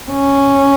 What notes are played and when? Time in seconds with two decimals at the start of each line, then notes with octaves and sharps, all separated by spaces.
0.11 C#4